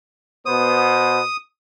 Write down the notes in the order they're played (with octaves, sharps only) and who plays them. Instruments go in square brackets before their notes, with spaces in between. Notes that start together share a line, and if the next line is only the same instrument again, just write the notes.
[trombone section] B2 B3 C5 [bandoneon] D#6